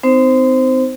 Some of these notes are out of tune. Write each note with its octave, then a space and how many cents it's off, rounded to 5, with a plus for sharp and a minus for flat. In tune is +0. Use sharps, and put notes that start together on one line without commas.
C4 -30 D#4 +0 C5 +0